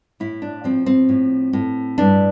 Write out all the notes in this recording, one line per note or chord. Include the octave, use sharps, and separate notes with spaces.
A2 E4
D4
F3 C4
C4
A2
A2
G2 D4